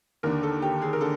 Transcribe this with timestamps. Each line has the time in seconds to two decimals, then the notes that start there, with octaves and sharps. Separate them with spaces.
0.23 D#2 D3 A#4
0.43 A4
0.62 G4
0.82 G#4
0.93 A#4
1.01 D3 A4